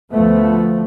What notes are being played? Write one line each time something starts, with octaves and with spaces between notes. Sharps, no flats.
D2 F3 A3 B3